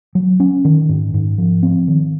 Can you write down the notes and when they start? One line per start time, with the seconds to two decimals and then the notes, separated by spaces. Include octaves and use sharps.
0.15 F#3
0.40 C#4
0.65 D#3
0.89 G#2
1.14 G#2
1.38 F3
1.63 C4
1.88 D#3